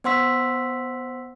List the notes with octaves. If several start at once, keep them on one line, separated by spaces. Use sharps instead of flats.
B3 C5 F#5 C6 E6 B6